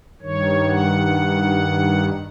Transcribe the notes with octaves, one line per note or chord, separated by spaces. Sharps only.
G2 D#3 C#5
F#5